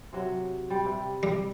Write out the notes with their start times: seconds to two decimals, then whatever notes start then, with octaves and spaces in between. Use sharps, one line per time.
0.13 C3 F#3
0.70 G3
0.85 C3
1.23 G3